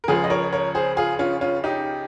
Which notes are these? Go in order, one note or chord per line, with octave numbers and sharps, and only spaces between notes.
A#4
C#2 C#3 F3 F4 G#4
D#5
A#4 C#5
A#4 C#5
G#4 C5
F4 G#4
C#4 F4
C#4 F4
D#4 G4